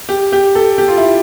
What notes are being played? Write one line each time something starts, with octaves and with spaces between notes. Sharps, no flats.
G4
G4
A4
G4
F4
E4